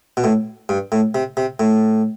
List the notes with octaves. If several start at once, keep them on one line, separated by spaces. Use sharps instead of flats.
B2
A2
G2
A2
C3
C3
A2